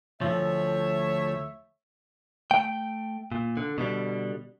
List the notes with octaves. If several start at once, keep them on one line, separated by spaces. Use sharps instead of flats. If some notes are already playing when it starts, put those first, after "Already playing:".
D2 G2 F3 A3 C#5 E5
A3 G5
A#2
D3
B2 D3 G3